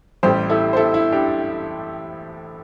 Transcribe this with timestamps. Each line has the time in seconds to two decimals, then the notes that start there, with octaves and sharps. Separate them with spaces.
0.23 A1 A2 G3 G4 C5
0.50 E4 A4
0.73 C5
0.77 E4 A4
0.94 E4
1.12 D4 G4